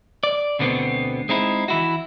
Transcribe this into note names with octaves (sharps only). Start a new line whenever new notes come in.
D5
D2 B2 D3 B3 C4
G#3 C4 D#4 E4
E3 E4 F#4